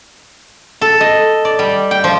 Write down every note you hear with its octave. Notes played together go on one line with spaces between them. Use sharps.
A4
D#5
D5
G3
G5
F3